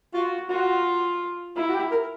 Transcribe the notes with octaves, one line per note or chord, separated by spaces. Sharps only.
F4 F#4
F4 F#4
E4 F4
F#4
G4
A#4